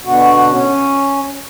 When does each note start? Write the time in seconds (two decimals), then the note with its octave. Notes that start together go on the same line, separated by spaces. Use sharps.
0.05 B2 D3 F#4
0.51 C#4